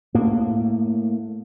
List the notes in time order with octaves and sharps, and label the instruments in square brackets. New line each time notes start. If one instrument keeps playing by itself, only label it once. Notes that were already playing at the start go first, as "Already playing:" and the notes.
[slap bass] A2 A#3